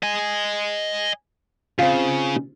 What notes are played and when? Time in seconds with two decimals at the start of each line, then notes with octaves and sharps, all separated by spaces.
0.03 D#5 G#5
1.79 C#3 C4 F4